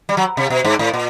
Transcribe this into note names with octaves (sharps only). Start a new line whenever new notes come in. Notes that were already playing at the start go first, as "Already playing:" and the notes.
G3
F#3
C3
B2
G#2
A2
A#2